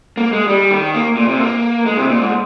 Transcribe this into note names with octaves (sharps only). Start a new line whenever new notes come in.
A#3
G#3
G3
D#3
A#3
A#2
C3
A#3
G#3
C3
A#2
G#2